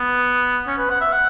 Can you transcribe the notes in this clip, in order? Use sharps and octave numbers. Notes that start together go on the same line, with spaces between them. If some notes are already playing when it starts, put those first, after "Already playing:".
Already playing: B3
C#4
B4
F#5
E5
F#5